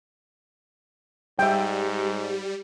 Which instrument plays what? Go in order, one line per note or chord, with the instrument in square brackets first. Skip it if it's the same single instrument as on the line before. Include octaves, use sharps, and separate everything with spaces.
[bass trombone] G#2 [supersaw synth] G3 [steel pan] E5 G5